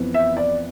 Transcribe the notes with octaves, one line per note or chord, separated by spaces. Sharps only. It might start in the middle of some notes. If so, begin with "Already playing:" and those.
Already playing: F2 E3 B3
E5
D5